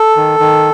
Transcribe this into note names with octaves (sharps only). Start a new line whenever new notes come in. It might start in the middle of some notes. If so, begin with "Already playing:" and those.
Already playing: A4
D#3
D#3